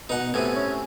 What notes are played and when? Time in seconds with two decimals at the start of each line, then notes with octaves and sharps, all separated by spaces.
0.09 B2 D#4 F#5
0.34 A2 C3 B3 G#5
0.56 C#4